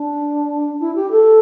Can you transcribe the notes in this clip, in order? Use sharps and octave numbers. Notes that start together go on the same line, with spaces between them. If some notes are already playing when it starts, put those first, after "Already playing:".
Already playing: D4
E4
G4
A4